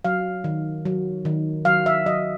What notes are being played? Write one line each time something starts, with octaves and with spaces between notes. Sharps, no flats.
F#3 F5
D#3
F#3
D#3
F#3 F5
E5
F#3 D#5